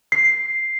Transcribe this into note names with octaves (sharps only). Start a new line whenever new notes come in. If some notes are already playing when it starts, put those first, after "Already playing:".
C7